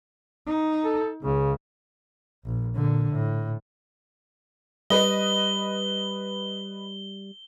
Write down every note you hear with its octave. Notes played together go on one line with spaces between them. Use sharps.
D#4
A4
C#2 C#3
A#1
A#2 D3
A2
G3 B4 D#5 G7